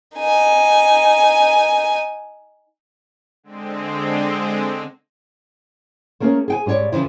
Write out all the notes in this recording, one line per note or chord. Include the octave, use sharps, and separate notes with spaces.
D#4 G#5
D3 G#3 C4
A3 A#3 C#4 G#4 A#4
G#4 G5 G#5
G#2 G3 F4 C#5 D5
F2 C#3 E3 F3